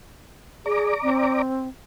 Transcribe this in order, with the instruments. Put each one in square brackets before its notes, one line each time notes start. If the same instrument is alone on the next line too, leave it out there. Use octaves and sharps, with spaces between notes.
[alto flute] G#4 [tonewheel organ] D5 A#5 D6
[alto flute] C4